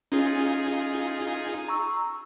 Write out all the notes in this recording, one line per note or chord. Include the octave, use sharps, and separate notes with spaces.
C#4 D#4 F4 G#4
A#5 C#6 E6